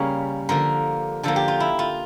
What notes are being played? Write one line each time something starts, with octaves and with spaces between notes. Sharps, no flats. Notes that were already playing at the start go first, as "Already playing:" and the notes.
Already playing: C#3 G3 A#3 C#4 A#4 C#5
D3 F3 A#3 A#4
D3 F3 A#3 A4
G4
F4
E4
F4